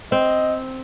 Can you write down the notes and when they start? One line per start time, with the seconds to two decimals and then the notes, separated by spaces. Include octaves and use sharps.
0.12 C4 D#5